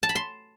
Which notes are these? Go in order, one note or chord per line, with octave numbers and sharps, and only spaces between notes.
A5
B5
C6